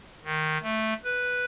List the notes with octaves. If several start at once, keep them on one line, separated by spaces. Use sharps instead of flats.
D#3
A3
B4